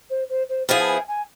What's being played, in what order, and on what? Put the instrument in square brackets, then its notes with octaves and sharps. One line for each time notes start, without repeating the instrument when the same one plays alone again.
[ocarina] C5
C5
C5
[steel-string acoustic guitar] F3 B3 E4 G#4 [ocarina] F5
[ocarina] A5
G#5
G#5